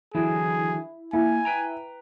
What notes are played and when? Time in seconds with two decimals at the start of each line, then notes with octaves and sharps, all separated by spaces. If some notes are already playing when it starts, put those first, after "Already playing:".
0.15 D3 E3 F#3 E4 G#4
1.13 A#3 E4 G#5
1.45 B4 G5 A#5